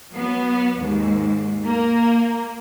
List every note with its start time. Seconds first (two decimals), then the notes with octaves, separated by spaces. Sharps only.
0.11 F#3 B3
0.78 D#2 G#2
1.65 A#3 A#4